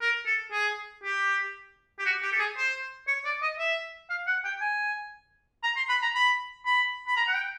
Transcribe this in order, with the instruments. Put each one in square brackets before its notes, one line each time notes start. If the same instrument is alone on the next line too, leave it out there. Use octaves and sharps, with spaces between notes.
[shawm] A#4
A4
G#4
G4
G4
F#4
G4
A4
G#4
C5
C#5
D5
D#5
E5
F5
F#5
G5
G#5
A#5
C6
B5
A#5
B5
B5
B5
A#5
F#5
G5